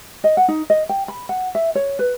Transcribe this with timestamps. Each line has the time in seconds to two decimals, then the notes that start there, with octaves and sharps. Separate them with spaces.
0.24 D#5
0.37 F#5
0.48 D#4
0.70 D#5
0.89 G5
1.08 B5
1.29 F#5
1.55 E5
1.75 C#5
1.99 B4